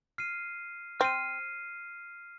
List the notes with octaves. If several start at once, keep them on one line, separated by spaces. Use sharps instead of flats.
F6 C7 D#7
C4 F6 C7 D#7